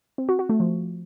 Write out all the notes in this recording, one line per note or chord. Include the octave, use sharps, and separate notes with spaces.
C4
F#4
F#4
A3
F3